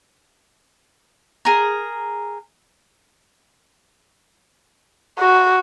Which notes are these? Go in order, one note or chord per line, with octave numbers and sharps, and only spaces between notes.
G#4 A#4
F#4